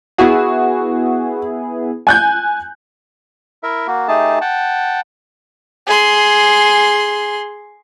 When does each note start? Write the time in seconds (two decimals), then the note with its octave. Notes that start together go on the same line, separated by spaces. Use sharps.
0.18 B3 E4 F#4 G#4
2.07 G#5 F#6 G6
3.63 E4 A#4 E5
3.87 A#3 F#4
4.08 A3 D#4 G4 G#4 A5
4.41 F#5 G5 A5
5.87 G#4 C6